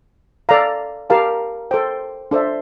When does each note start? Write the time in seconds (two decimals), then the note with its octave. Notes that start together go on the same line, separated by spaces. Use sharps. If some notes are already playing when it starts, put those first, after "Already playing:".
0.49 A4 D5 F5 A#5
1.10 G4 A#4 F5 A5
1.71 A4 C5 G5
2.31 D4 A4 C5 E5